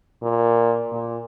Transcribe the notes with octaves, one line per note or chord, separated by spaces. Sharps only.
A#2
A#2